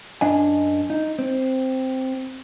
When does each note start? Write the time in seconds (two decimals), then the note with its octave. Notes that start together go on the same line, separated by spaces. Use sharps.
0.21 F#2 D4 D#5 G#5
0.90 D#4
1.19 C4